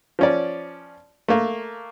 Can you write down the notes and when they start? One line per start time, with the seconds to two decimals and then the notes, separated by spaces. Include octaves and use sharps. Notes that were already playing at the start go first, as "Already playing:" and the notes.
0.19 F3 C#4 D5
1.28 A3 A#3